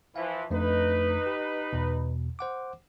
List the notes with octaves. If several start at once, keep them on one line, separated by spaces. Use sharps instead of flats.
E3 F3 F5
F2 A3 D4 D#4 B4
G4
E2 B2
C5 F#5 D6